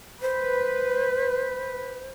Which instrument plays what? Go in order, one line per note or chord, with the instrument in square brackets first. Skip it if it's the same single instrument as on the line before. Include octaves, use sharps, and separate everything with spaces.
[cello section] B4 [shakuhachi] C5